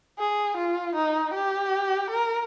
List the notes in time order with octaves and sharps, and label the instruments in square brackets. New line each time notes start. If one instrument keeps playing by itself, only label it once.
[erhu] G#4
F4
D#4
G4
A#4